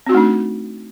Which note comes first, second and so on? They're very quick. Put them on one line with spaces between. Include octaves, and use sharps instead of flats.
C4 F#4 D#4 A3 D4